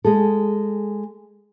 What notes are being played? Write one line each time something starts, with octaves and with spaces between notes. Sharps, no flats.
G#3 G#4 A4